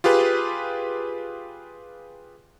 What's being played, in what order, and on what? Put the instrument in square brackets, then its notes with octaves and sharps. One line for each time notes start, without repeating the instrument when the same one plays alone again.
[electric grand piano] F4 G4 G#4 B4